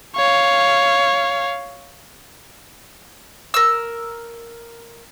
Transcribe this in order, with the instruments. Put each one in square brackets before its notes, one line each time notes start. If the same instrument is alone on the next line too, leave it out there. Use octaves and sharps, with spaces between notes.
[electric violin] C#5 F5
[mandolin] A#4 E6